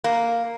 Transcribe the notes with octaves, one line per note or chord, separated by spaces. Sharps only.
A#3